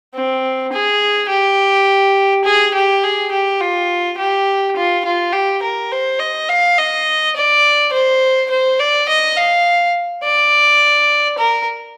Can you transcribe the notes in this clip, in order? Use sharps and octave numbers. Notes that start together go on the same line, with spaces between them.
C4
G#4
G4
G#4
G4
G#4
G4
F4
G4
F4
F4
G4
A#4
C5
D#5
F5
D#5
D5
C5
C5
D5
D#5
F5
D5
A#4